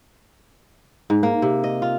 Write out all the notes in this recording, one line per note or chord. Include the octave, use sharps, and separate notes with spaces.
G#2
A#3
C3
D#5
F4